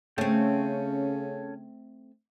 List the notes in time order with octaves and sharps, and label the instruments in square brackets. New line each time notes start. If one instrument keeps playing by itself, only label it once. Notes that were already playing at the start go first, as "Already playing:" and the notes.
[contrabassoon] C#3 [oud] A3 C4 [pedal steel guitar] C#4 A4 G5